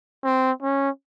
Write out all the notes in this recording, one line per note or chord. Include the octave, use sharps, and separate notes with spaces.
C4
C#4